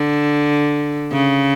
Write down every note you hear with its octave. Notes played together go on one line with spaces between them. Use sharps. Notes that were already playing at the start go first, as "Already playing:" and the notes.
Already playing: D3
C#3